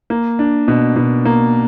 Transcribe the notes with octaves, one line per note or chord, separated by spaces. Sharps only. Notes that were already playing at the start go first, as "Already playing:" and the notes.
A#3
D4
B2
B2
A#3